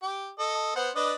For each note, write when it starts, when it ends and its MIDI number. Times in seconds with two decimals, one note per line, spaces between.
0.02 0.30 67
0.39 0.73 69
0.39 0.73 75
0.76 0.90 59
0.76 0.90 72
0.76 0.90 78
0.95 1.14 62
0.95 1.14 71
0.95 1.14 75